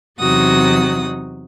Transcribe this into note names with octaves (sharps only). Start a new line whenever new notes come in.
E2 C3 F#3 D#4 F#4 D#6